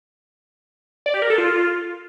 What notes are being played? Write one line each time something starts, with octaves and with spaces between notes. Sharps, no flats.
D5
G4
A#4
A4
F4